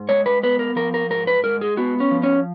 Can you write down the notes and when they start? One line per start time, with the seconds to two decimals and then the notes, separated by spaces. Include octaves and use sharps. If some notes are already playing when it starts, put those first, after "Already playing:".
Already playing: G#2
0.09 G#3 C#5
0.26 B4
0.43 B3 B4
0.59 A#4
0.76 F3 A#4
0.94 A#4
1.10 G#2 A#4
1.27 B4
1.44 G#3 A#4
1.61 G#4
1.77 B3 F#4
2.00 C#4
2.11 F3
2.23 C#4